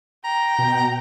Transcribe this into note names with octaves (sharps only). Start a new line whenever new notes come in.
G5 A#5
B2